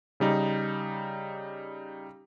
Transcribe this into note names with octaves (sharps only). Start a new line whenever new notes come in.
C#3 G3 D#4